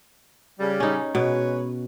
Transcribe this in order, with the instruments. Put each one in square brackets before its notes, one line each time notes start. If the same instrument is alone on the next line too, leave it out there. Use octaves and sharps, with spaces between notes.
[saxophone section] C#3 G3
[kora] C#4 D#4
[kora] B2 [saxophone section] G#3 B4 C#5